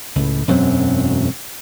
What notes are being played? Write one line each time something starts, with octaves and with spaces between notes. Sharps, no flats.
C#2 A2
E1 F#2 F#3 C4